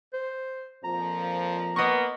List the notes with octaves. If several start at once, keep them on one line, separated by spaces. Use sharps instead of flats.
C5
F2 A#2 F3 A#5
A#3 B3 D#5 C#6